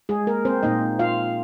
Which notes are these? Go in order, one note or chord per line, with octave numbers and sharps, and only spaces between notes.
G#3 G#4
A#3 A#4
C4 C5
A#2 A#3 D#4 D#5
F4 F5